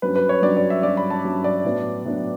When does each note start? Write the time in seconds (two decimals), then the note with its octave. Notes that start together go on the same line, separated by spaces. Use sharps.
0.02 G2 F#3 C#4 B4
0.16 B4
0.29 C#5
0.42 G2 F#3 C#4 D5
0.57 D5
0.70 E5
0.83 G2 F#3 C#4 D5
0.97 B5
1.10 A5
1.24 G2 F#3 C#4
1.44 D5
1.65 A2 F#3 B3 D4
2.05 A2 F#3 B3 D4